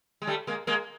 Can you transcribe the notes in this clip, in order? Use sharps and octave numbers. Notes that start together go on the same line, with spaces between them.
G#3
G3 A3
G#3 A#3
G#3 A#3